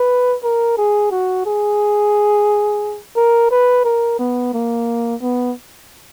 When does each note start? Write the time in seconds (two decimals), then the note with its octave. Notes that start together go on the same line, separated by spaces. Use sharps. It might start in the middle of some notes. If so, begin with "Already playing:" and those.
Already playing: B4
0.43 A#4
0.77 G#4
1.11 F#4
1.46 G#4
3.16 A#4
3.51 B4
3.85 A#4
4.19 B3
4.54 A#3
5.22 B3